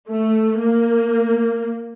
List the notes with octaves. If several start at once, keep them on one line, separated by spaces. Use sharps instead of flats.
A3
A#3